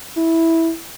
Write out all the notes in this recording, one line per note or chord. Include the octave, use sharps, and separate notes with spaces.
E4